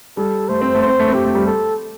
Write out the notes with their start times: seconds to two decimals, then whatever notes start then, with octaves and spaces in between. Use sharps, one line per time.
0.17 G3 A4
0.49 A3 C5
0.61 C4
0.75 A3
0.82 C5
0.87 C4
1.00 A3
1.08 C4
1.13 A3 G4
1.25 A3
1.35 G3
1.46 A4